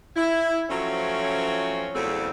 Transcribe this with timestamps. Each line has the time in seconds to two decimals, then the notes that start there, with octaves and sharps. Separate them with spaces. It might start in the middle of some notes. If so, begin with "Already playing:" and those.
0.15 E4
0.69 F3 F#3 A3 C4 C#4
1.94 E2 C#3 F#3 G3 A3 C4